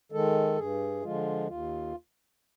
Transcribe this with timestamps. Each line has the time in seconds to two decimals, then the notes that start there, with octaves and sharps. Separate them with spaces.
0.12 D#3 G#3 A4
0.57 G2 G#4
1.02 D3 F3 G#3 F4
1.47 D#2 F4